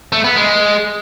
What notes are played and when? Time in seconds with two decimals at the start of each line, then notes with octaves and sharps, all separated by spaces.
0.12 A3
0.24 B3
0.36 G#3